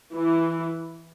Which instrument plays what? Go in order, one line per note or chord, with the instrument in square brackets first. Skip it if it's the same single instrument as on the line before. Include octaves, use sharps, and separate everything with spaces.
[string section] E3